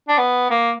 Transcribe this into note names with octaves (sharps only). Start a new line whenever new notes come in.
D4
B3
A#3